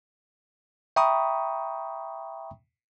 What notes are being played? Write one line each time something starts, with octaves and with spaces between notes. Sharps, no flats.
E5 G5 A#5 B5 C#6 D#6